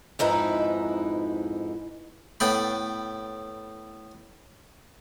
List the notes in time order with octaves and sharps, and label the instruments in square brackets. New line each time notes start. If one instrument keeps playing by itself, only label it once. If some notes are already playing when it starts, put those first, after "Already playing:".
[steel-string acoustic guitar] F2 G#2 D#4 E4 B4
[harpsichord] A2 B3 G5 B5